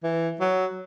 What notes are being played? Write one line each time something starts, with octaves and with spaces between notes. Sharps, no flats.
E3
F#3